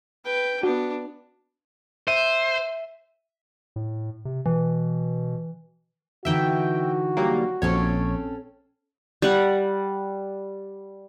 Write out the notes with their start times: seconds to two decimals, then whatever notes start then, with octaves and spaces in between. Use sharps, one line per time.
0.25 B4 G5
0.63 B3 D4 F#4
2.08 C5 E5 D#7
3.76 A2
4.25 C3
4.46 B2 E3
6.25 D3 E3 D#4 F#4 E5 G5
7.17 F#3 G3 A#3
7.62 A#1 C4 C#4 A4 C#5
9.22 G3 F#5